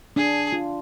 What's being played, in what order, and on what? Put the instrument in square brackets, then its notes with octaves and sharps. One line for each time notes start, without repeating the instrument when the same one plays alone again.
[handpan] D4 [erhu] G#4
[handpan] F4